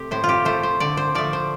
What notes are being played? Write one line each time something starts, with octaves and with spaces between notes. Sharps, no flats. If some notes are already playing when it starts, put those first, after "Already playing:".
Already playing: C3 A3 C4 G4
A2 C5
F4
G4
A3 C5
C5
D3 D5
C5
F3 A3 D5
C5